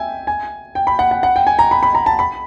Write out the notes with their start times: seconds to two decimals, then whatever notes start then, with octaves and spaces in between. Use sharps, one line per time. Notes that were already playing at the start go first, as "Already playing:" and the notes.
Already playing: E5 G5 G#5
0.27 G#5
0.75 G5
0.87 B5
0.99 F#5
1.11 F#5
1.23 F#5
1.36 G5
1.47 G#5
1.59 A#5
1.71 B5
1.83 B5
1.95 A#5
2.06 A5
2.19 B5